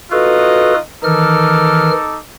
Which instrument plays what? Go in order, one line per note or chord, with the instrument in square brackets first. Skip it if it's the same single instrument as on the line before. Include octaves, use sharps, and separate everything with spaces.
[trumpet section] D#4 F4 D#5 [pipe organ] F#4 A4 B4
[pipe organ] D#3 E3 F6 [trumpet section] D#4 A4 D6